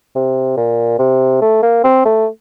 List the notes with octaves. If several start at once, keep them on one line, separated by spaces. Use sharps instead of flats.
C3
A#2
C3
A3
A#3
C4
A3